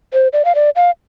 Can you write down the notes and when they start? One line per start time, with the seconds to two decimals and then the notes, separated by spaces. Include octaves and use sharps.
0.13 C5
0.33 D5
0.45 F5
0.55 D5
0.76 F5